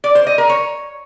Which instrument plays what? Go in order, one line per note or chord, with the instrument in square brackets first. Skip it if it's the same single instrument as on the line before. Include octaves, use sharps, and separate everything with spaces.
[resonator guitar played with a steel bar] D5
C5
D#5
A#4
C#5